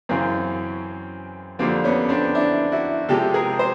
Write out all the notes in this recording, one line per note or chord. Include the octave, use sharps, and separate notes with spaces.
F#2 C#3 E3 C4
F2 D3 G3 A#3 C4
B3 C#4
C4 D4
D4 E4
E4 F#4
C3 F3 G#3 G4 A4
G#4 A#4
C5